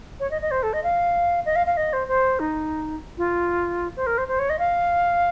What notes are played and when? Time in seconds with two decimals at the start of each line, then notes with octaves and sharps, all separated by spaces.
0.20 C#5
0.31 D#5
0.42 D#5
0.51 C5
0.63 A4
0.73 D#5
0.83 F5
1.45 D#5
1.56 F5
1.66 F5
1.77 D#5
1.93 C5
2.08 C5
2.40 D#4
3.18 F4
3.96 C5
4.07 A#4
4.18 C5
4.28 C5
4.39 C#5
4.50 D#5
4.59 F5